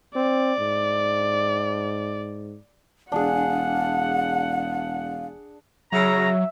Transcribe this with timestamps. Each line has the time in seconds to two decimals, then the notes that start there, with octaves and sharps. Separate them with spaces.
0.15 C4 D5
0.59 G#2
3.12 E1 D4 G#4 F5 F#5
5.92 C#3 F#3 E5 A#5